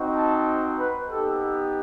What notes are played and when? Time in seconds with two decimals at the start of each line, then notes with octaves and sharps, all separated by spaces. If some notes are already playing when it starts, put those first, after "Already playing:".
Already playing: C4 D#4 F#4
0.14 A5
0.77 B4
1.09 B3 D#4 G4 A4